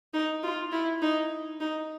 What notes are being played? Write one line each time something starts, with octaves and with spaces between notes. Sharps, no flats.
D#4
F4
E4
D#4
D#4